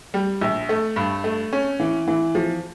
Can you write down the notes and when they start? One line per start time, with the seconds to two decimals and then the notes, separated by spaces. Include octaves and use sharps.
0.14 G3
0.41 A#1
0.69 A3
0.96 G2
1.24 A3
1.53 C#4
1.80 E3
2.08 E3
2.35 F3